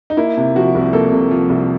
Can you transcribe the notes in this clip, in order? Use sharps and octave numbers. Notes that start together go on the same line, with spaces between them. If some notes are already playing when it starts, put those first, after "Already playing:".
D#4
A#3 E4
C3
F3 F#4
C2
A#3 A4
C3
F3
C2